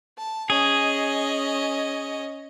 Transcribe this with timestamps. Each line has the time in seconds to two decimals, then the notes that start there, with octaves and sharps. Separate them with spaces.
0.18 A5
0.50 C#4 G#4 D#5